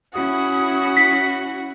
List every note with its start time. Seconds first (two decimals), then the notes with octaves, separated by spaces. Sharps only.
0.14 C#4 E4 F#4 D#6
0.97 B6